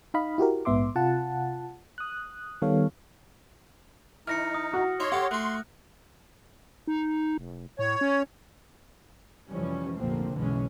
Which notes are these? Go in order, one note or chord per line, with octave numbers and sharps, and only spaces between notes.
D#4 D#5 F5 B5
E4 F#4 G4 A#4
A#1 G#2 B3 E5 C6 D6
C3 F4 F#5 A5
D#6 F#6
D#3 G3 B3 A4 C#5 F5
E3 D#4 F6 A#6 C#7
D#6
F#4
D#4 C#5 E5 C6
G4 A4 F#5
A3 F#4 C6 F#6
D#4
F1
A2 C#5
C#4
F1 E3 F3 G3 C#4
F1 A#1 D3 F3 A#3 C4
F#1 B1 E3 G#3 C#4